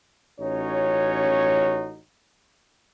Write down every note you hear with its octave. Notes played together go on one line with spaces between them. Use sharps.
A1 C#4 D#4 F#4 C#5